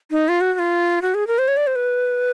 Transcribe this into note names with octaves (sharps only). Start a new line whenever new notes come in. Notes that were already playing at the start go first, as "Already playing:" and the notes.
D#4
F4
F#4
F#4
F4
F#4
G#4
A#4
C5
C#5
D5
C5
B4